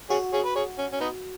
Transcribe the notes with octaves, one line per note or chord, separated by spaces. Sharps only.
F#4 G#4 C#5
G#4 C#5
B4
G#4 C#5
C#4
C#4
B3 D#4